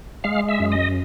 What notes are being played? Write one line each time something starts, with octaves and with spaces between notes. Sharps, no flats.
G#3 F5
E5
F#2
D#5